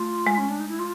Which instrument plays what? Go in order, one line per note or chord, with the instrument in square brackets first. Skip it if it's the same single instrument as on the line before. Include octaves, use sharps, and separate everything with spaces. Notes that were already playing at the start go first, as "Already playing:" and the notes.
Already playing: [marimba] A3 [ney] F4
[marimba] G#3
[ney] C#4
D4
D#4
E4
F4